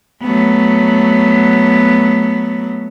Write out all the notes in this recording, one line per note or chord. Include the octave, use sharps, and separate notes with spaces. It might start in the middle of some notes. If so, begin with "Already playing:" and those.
F#3 A3 B3